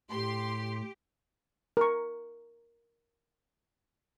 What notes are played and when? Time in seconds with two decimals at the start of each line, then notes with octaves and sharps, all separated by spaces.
0.12 A2 G4 C6
1.77 A#4 C#6